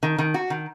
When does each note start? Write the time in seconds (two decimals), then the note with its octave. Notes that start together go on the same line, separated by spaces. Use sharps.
0.03 D#3
0.18 D#3
0.34 F#4
0.50 D#3